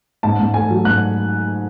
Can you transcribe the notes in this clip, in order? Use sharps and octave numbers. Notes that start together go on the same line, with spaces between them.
G#2 A5
G#2
A3 G#5
F#3
G#2 F#6